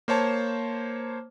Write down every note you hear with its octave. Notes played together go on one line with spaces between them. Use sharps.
A#3 C5 C#5 A5